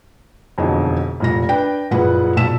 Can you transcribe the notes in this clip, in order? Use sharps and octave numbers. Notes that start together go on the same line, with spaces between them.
E1 F2 B2 D3 D#4
F1 A#2 A#6
D4 B4 G5
F#1 A#2 F3 G#4 B4 F#5
B1 A#2 A5 E6 B6 E7